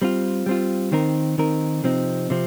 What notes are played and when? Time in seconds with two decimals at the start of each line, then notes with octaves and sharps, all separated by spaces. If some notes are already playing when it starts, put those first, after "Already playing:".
0.02 G3 C4 F4
0.46 G3 C4 F4
0.92 D#3 C4 D#4 A#4
1.38 D#3 C4 D#4 A#4
1.84 C3 F3 C4 D#4
2.30 C3 F3 C4